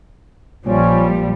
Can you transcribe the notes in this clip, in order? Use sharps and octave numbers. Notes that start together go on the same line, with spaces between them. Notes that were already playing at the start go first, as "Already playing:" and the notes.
A#1 A#2 F3 G3 C#4